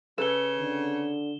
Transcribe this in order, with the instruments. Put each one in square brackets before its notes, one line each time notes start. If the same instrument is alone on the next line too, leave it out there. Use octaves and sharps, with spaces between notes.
[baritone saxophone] C#3 [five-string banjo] A4 B4 [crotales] E7 G7
[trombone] D3